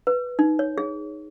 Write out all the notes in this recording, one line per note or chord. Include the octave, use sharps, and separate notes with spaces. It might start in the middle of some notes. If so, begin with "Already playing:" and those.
B4
D#4
C#5
G#4